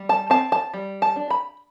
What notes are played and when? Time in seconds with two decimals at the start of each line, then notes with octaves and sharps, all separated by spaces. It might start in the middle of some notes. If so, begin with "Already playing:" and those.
Already playing: G3
0.09 A5
0.30 C4 A5
0.52 A5
0.74 G3
1.02 A5
1.16 D4
1.30 B5